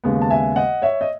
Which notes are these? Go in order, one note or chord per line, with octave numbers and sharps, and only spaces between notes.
D#2 C#3 G#3 B3
A5
E5 G#5
D#5 F#5
C#5 E5
D#5